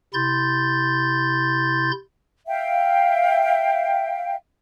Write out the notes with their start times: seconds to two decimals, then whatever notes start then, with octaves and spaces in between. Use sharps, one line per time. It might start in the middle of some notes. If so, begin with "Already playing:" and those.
0.14 C3 E4 C6 G6 A6
2.47 E5 F5 G5